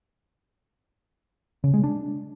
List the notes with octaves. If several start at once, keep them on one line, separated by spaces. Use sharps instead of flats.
C#3
G#3
D4